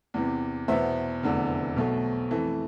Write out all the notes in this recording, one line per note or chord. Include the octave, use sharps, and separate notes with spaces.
E2 C3 E3
E2 B2 B3 C5 E5
F1 E2 D3
B1 B2 A3
F2 E3 A3